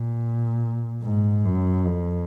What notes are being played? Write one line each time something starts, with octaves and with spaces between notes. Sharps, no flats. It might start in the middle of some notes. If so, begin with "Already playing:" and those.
Already playing: A#2
G#2
F#2
F2